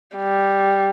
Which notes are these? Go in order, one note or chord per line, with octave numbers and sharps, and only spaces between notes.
G3